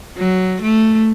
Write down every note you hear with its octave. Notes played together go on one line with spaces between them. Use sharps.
F#3
A3